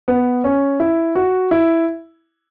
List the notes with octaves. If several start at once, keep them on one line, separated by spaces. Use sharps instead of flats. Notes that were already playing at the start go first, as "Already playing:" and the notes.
B3
C#4
E4
F#4
E4